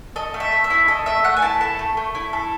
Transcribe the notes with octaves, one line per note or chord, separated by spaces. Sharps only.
A4 D#5
A3
E5
A3
E5
E4
A4 D#5
A3 E5
A3 F#5
G#5
E4 A5
A4 A5
A3
A3
E4
A4